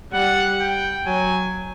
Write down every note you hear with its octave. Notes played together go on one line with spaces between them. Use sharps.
G3 F#5
G5
F#3 G#5